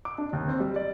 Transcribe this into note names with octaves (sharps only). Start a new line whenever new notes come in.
D6
D4
D#2
C4
G3
D5